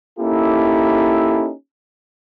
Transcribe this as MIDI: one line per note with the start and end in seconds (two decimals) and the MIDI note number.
0.20 1.51 58
0.20 1.51 61
0.20 1.51 63
0.20 1.51 64
0.20 1.51 67
0.20 1.51 69